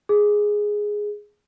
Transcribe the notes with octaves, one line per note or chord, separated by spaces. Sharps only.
G#4